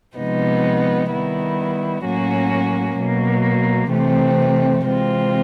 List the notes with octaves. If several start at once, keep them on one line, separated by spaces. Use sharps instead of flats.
C3 F3 G#3 B3 D#4
D#3 G3 B3 E4
A2 F#3 A#3 C#4 F#4
B2 F#3 A#3
C3 E3 A3 C4
C3 E3 G#3 C4 F4